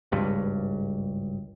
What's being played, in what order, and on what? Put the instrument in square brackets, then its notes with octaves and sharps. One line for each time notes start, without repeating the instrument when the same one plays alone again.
[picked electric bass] G#1 C#2 G2